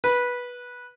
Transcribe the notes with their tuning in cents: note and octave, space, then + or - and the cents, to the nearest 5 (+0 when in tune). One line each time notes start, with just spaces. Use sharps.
B4 -15